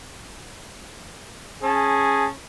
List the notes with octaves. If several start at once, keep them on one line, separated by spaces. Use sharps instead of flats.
C#4 G#4 A5